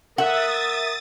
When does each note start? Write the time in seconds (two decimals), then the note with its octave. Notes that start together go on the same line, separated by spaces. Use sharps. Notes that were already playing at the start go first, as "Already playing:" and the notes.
0.18 A#4 E5 F#5 D#6 A6